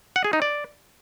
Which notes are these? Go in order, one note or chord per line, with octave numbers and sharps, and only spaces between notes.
F#5
G#4
D#4
D5